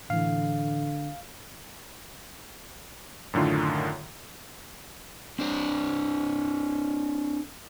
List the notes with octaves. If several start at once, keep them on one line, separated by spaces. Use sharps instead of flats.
A2 D3 E3 F5
F#2 A2 D3 D#3 F4
C4 D4 C5